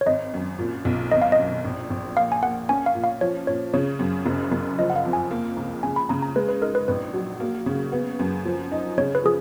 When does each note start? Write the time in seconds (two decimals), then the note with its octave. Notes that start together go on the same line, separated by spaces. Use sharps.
0.01 C#5
0.06 G#1 D#5
0.34 F#2
0.59 A#2
0.85 B1
1.11 G#1 D#5
1.22 F5
1.32 D#5
1.38 F#2
1.65 A#1
1.90 A#1
2.17 A#3 F5
2.32 G#5
2.42 A#3 F#5
2.69 C#4 G#5
2.86 F5
2.95 A#2
3.04 F5
3.21 F3 C#5
3.47 A#2 C#5
3.74 C#3 C#5
3.99 F#2
4.26 F#1
4.52 F#1
4.79 F3 D#5
4.90 F#5
4.96 F5
5.05 F2
5.13 G#5
5.31 A#3
5.57 C#2
5.83 C#3 G#5
5.96 B5
6.09 C#3 A#5
6.22 A#5
6.35 G#3 B4
6.49 B4
6.61 D#4 A#4
6.75 B4
6.88 A#1 B4
7.14 F#3
7.40 A#3
7.66 C#3
7.92 B3
8.19 F#2
8.45 F3
8.72 D#4
8.97 C#3 C#5
9.15 B4
9.24 F3 G#4